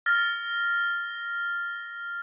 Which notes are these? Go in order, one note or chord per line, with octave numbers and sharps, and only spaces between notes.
F6 A6 A#6